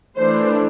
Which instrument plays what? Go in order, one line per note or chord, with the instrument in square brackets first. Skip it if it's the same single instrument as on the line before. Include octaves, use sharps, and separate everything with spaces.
[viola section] E3 A3 D4 C5